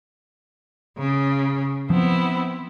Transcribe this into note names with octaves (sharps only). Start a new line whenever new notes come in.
C#3
F3 B3 C4 E4